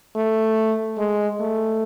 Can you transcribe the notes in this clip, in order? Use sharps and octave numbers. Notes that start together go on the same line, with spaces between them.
A3
G#3
A3